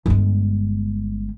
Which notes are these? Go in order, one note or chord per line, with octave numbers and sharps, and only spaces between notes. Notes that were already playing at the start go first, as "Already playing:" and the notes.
G1 G#3